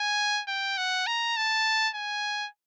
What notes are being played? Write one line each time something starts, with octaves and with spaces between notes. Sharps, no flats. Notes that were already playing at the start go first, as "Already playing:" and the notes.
Already playing: G#5
G5
F#5
A#5
A5
G#5